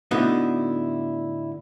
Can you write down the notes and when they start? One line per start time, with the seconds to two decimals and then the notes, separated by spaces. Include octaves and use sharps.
0.11 A2 D3 B3 D#4 E4 F#4